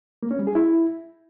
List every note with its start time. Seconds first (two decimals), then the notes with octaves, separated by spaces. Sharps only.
0.23 A#3
0.31 C#4
0.39 G3
0.47 G#4
0.55 E4